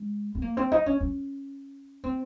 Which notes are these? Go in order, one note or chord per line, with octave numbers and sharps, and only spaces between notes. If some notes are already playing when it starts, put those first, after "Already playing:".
Already playing: G#3
C4
A#3
C4
D#4
C#4
C#4
C4